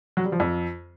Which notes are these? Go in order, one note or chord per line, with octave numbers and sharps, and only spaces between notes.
F#3
G3
F3
F2